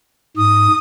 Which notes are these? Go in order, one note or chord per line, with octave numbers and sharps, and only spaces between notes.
G#2 D#6